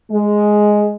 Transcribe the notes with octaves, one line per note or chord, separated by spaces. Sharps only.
G#3